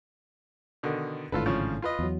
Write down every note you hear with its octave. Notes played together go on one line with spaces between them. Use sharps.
B2 D3 D#3
G#1 A2 D3 F4 A4 B4
C#3 F3 C#5
F4 B4 D#5
E2 F#3